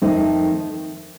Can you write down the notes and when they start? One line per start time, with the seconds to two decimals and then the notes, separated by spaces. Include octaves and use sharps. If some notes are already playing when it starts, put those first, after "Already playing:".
0.02 F2 D#3 A3 C4 D#4